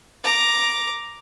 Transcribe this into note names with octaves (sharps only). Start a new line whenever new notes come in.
A#5 D6